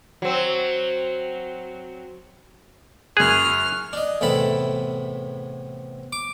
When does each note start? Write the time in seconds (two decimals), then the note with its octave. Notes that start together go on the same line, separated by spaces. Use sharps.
0.22 F#3 C4
3.17 F#2 G#4 C#5 F6 F#6
3.93 D4 D#5
4.21 E2 A2 C3 A4 B5
6.13 D6